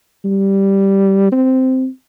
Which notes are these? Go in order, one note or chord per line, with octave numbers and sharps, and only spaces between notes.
G3
C4